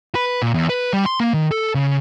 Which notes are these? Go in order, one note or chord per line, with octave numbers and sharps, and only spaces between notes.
B4
A#2
E2
B4
G3
C6
A#3
D#3
A4
C#3